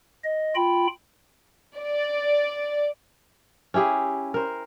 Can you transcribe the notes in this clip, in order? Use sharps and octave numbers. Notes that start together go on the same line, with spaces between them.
D#5
F4 G5 B5
D5
C#4 E4 G4 G#4
A#4 C5